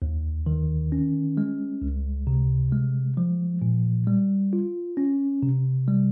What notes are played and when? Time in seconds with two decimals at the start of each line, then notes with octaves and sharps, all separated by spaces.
0.02 D#2
0.46 D#3
0.92 C#4
1.37 G#3
1.82 C#2
2.27 C3
2.72 G#3
3.17 F3
3.62 A#2
4.07 G3
4.53 F4
4.97 C#4
5.43 C3
5.88 G3